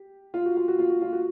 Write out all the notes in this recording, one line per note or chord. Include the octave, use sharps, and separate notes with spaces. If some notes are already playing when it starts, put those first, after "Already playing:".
Already playing: G4
F4
F#4
F4
F#4
F4
F#4
F4
F#4